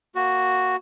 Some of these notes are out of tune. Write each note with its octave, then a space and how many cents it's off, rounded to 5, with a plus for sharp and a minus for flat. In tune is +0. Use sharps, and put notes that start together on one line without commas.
A#3 +0 F#4 +0